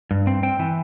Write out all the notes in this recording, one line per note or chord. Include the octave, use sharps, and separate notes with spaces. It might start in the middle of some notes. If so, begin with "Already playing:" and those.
G2
C4
C4 G5
E3